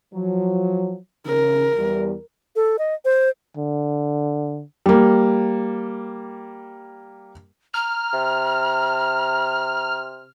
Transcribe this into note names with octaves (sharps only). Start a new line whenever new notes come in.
F3 F#3
C#3 A#4
E2 G3
A4
D#5
C5
D3
G3 A#3
A#5 F6
C3